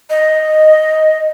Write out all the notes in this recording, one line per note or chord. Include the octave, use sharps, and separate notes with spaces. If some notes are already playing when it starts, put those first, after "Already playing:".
D#5